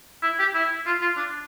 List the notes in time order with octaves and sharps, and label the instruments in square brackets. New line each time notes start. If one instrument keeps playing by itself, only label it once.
[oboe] E4
G4
E4
F4
F4
D4